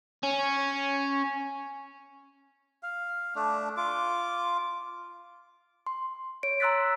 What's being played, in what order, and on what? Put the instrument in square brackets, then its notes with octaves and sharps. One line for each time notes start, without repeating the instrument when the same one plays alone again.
[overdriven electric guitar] C#4
[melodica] F5
A3 D4
F4 D6
[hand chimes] C6
C#5 D7
A#5 C6 E6 F#6 A6 B6